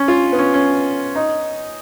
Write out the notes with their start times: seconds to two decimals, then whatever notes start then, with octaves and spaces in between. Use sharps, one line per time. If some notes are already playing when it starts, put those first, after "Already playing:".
Already playing: C#4
0.08 F4
0.33 B3
0.38 C#4
0.54 C#4
1.16 D#4